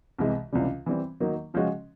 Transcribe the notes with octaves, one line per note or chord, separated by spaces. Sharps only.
C2 C3 E3 G#3
C#2 C3 E3 G3
E3 G3 C4
D#3 F#3 A#3 D#4
C#3 F3 G#3 C#4 F#4